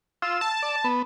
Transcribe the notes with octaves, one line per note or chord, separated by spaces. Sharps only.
F4 E6
A5
D5
B3